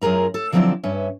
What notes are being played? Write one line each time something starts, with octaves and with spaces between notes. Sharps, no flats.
F#2 F4 G#4 A#4 A#5
A4
D3 F3 F#3 C4 E4 D5
G2 C#4 B4 E5